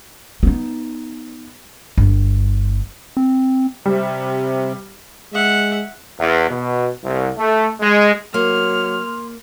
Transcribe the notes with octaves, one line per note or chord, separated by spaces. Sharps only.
B3 D#4
G1
C4
C3 G3
G#3 E5 F#5
E2
B2
C2
A3
G#3
F#3 A#3 C6 F6